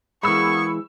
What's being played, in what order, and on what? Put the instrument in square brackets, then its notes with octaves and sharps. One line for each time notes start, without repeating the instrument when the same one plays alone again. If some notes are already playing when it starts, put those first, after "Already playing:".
[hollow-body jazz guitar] E3 G#3 [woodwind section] A#3 B3 G#4 [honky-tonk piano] B5 E6 [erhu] C#6